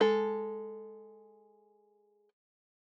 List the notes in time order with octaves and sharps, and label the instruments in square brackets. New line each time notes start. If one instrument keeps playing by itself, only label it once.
[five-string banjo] G#3 A4